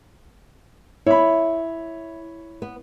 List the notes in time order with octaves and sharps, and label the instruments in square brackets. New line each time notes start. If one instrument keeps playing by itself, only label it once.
[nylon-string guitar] E4 [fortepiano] C#5 B5
[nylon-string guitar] B3